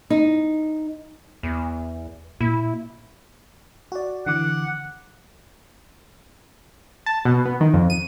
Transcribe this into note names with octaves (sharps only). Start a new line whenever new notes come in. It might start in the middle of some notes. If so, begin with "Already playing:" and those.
D#4
E2
A#2 E4
F#4 D5
D3 E3 F#5 D6
A5
B2
B3
D#3
F2
D#7